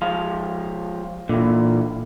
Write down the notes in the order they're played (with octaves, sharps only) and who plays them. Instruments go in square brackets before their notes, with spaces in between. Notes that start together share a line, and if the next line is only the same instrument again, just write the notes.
[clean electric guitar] F3 G#3 F5
[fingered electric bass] A#2 [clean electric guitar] D3 E3